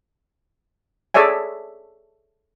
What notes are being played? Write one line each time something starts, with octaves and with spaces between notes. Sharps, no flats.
G#4 A4 C#5 D5 E5 G#5